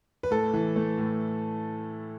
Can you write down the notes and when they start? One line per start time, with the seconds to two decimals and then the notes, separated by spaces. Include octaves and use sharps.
0.23 B4
0.31 A2 A4
0.54 E3
0.76 A3
0.98 A2